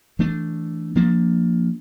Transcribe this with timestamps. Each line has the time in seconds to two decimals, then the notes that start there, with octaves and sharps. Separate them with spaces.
0.19 E3 A3 D4
0.95 F3 A#3 D4